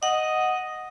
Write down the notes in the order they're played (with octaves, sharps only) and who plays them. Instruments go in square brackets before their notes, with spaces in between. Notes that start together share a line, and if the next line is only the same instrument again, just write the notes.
[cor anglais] D#5 [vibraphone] F#5